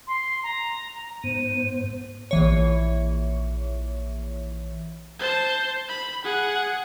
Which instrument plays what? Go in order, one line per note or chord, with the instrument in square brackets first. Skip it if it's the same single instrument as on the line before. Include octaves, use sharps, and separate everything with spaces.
[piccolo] C6
A#5
[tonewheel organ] G#2 B3 C5 [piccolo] D#7
[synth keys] A#1 E3 C#5
[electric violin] C5 A5
B5
G#4 F#5